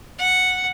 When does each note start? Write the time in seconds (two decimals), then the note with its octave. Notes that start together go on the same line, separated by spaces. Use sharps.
0.18 F#5